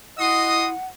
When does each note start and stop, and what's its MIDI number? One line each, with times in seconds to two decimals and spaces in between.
0.18 0.73 64
0.18 0.68 66
0.18 0.66 75
0.18 0.86 78
0.18 0.68 84
0.18 0.68 87